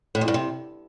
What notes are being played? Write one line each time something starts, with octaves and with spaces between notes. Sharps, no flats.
A2
F2
G2
C3